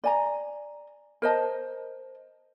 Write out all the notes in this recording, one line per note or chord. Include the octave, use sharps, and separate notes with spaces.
D5 G#5 A#5
A#4 C5 D#5 A5